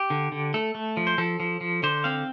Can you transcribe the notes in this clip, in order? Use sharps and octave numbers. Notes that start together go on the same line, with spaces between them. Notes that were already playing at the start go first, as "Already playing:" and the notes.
Already playing: G4
D3
D3
A3 A4
A3
F3
C5
F3 A4
F3
F3
D3 C5
C4 F5